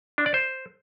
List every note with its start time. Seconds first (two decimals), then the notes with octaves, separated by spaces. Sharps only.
0.18 D4
0.26 D5
0.34 C5